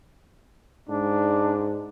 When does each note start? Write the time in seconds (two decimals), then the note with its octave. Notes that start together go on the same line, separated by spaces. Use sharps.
0.89 G#2 D4